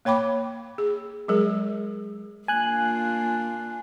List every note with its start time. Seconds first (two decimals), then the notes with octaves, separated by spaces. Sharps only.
0.05 A#3 C#5 G5 B5 D6
0.78 G#4
1.28 F#3 G#3 G#4 A#4
2.48 A#3 D4 F4 G#5 F#6